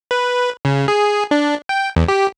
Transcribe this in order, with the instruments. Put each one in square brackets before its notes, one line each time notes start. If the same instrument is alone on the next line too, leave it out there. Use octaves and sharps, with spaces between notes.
[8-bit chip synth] B4
C#3
G#4
D4
G5
E2
G4